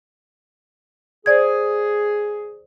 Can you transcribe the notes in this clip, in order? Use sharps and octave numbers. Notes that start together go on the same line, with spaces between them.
G#4 C5 D5 G#6